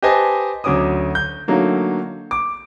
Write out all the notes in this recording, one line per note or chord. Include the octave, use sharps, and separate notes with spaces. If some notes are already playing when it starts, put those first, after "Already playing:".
G4 B4 C5 D#5 G#5 A5
D2 F#3 C#4 D6 D#6
G6
D3 F#3 A3 A#3 D#4
D6